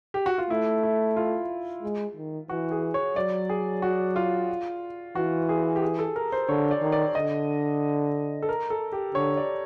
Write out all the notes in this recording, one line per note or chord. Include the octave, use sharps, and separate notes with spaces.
G4
F#4
F4
A3 E4
E4
F4
G#3
D#3
E3 F#4
G#4
C#5
F#3 D5
G#4
F#4
F4
E3 F#4
G#4
G4
G#4
A4
A#4
C5
D3 C#5
D5
D#3
D5
D3 D#5
A4
A#4
A4
G4
D3 C#5
D5